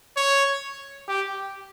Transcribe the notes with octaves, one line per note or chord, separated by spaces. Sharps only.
C#5
G4